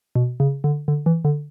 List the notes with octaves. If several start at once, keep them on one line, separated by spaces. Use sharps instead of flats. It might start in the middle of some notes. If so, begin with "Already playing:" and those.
B2
C#3
D3
D3
E3
D3